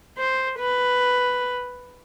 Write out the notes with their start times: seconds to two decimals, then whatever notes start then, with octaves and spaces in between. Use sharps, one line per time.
0.18 C5
0.60 B4